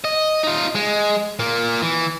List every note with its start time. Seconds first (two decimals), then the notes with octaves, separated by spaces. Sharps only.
0.04 D#5
0.43 D#4 F4
0.75 G#3
1.39 A#2 A#3
1.82 E3